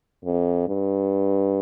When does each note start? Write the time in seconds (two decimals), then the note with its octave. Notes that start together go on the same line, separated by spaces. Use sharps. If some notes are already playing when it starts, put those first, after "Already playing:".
0.24 F2
0.68 G2